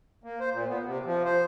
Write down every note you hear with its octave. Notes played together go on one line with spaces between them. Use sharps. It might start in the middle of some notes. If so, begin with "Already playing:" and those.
A#3
C5
A#2
B3
C3
F3
C5